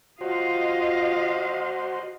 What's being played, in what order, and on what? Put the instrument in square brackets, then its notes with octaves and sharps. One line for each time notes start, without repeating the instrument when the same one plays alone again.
[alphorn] F4 [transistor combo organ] F#4 C5 [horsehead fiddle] D#5 F5